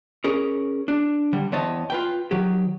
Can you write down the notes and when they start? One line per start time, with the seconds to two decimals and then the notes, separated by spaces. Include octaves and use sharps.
0.24 C#4 G#4 A#4
0.88 D4
1.33 D3 G3
1.52 E2 C4 C#5 D#5 A5
1.90 F4 B4 G5
2.31 D#3 F#3 G4